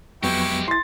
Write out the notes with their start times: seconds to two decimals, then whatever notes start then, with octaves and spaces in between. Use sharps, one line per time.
0.23 F2 F#3 G#3 B3 E4 G4 G5 C#6
0.68 E4 C6 A6